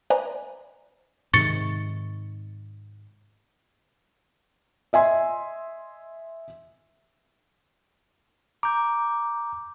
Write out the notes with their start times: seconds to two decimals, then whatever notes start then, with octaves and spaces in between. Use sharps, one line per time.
0.10 B4 C5 D5 D#5 G#5 A#5
1.34 G#2 C3 D#3 C#6 A6 C#7
4.93 D#5 E5 G#5 C6
8.63 A#5 D6 G6